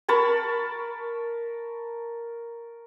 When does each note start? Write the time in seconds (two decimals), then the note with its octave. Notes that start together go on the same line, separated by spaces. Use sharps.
0.08 A#4 A5 B5 C#6